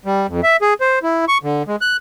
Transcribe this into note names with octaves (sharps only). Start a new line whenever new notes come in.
G3
F2
E5
G#4
C5
E4
C#6
D3
G#3
F#6